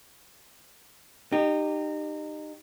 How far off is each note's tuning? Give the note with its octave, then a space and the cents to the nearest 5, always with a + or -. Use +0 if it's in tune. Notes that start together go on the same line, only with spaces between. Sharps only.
D#4 -25 G4 +0